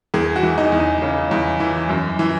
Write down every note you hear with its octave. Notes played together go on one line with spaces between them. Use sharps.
E2 G#4
F#4
E3
D#4
E2
D#4
C#3
E2
E3
F#2
E3